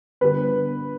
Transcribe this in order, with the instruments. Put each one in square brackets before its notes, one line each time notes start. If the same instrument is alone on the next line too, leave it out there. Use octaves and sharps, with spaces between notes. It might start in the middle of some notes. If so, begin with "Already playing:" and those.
[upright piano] D3 G3 B3 B4